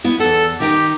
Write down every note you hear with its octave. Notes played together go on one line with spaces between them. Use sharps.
B3 E4
E2 A4 F#5
D#3 D#4 G4 G5